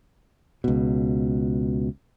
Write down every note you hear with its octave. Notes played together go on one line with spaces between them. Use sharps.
C#2 B2